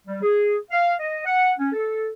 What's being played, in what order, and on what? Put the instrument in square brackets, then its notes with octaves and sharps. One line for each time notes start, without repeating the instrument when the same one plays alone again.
[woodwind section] G3
G#4
F5
D#5
F#5
C#4
A4